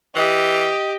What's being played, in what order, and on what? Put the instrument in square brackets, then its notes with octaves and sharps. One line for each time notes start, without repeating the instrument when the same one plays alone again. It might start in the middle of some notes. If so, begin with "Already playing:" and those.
[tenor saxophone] E3 [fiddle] G4 [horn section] D#5